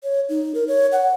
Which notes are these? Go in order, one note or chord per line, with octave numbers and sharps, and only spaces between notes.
C#5
D#4
A#4
C#5
F#5